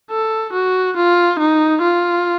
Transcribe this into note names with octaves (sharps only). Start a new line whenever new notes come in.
A4
F#4
F4
D#4
F4